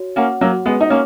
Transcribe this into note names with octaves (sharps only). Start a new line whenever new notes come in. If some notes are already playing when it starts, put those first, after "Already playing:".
Already playing: F#4 C#5
A#3 C#4 F#5
F#3 A#3
F#4
G#3 B3
D#4
A#3 C#4 C#5